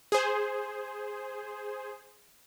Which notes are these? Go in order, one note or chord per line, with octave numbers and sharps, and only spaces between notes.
G#4 C5